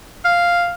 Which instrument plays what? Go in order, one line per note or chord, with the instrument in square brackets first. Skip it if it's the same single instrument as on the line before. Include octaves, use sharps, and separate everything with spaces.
[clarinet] F5